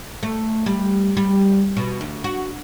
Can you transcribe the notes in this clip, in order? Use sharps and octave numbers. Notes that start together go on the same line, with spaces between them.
A3
G3
G3
B2
D2
F#4